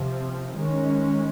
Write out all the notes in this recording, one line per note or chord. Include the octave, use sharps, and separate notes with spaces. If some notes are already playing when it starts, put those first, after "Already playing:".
Already playing: C3 F3 C4
D#3 G#3 C#4